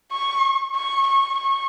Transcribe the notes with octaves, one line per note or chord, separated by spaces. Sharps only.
C#6
C#6
C#6
C#6